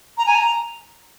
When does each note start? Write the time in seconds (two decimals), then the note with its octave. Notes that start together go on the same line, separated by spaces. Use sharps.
0.18 A#5
0.26 G#5
0.35 A#5